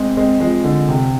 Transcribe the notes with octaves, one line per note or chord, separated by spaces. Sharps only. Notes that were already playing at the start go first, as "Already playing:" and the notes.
Already playing: G#3 C4
G#3 C4
F3 G#3
D3
C3